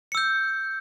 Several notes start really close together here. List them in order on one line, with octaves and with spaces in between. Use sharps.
C#7 E6 G6